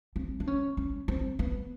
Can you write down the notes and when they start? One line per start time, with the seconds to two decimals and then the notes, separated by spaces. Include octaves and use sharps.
0.16 C4
0.40 D4
0.47 C#4
0.77 C#4
1.08 C4
1.39 B3